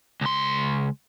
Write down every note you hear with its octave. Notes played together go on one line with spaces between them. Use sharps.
C#2 C6